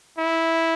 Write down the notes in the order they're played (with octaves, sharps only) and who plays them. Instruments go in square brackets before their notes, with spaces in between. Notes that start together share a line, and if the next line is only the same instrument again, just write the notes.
[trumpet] E4